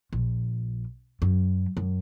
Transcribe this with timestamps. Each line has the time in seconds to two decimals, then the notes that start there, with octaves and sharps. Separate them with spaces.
0.13 A#1
1.22 F#2
1.77 F#2